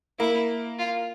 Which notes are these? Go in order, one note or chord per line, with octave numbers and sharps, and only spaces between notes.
A#3 E4
F4